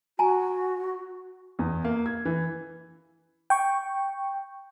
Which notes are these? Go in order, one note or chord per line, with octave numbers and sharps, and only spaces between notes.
F#4 G#5 A#5
E2
A#3
G#6
E3
G5 C#6